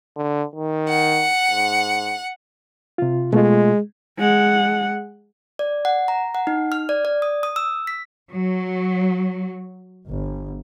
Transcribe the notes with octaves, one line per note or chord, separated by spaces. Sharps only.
D3
D#3
F#5
G#2
C3 F4
B2 G#3 A3 F4
G#3 F#5
D5
F#5
A#5
F#5
D#4
F6
D5
D5
D#6
D#6
E6
B6
F#3
G1